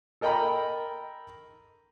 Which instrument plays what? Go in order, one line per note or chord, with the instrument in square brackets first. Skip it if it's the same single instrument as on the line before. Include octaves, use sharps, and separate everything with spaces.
[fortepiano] A4 A#4 D#5 G5 A#5 B5